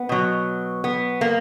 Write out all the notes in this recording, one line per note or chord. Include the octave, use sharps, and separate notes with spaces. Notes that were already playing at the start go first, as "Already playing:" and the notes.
Already playing: B3
B2 F#3
B3
A#3